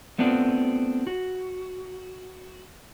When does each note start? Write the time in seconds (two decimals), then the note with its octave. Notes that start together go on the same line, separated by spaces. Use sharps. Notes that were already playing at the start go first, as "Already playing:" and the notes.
0.18 A3 B3 C4 D4 F4
1.07 F#4